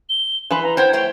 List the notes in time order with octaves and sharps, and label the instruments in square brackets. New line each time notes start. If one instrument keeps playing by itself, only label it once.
[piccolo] G7
[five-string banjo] E3 B4 B5 [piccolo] C6
[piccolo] A#5
[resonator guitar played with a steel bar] C5 F#5 G5 [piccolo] G#6
[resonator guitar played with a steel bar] A3 C5 C#5 [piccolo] G5